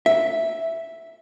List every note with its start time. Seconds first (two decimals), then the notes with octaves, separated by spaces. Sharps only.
0.06 E5